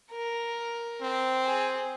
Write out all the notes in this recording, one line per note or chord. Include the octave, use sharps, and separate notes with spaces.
A#4
C4
G#4